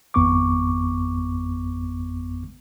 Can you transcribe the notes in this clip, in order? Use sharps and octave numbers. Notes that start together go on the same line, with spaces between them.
G#1 F2 B3 C#6 D6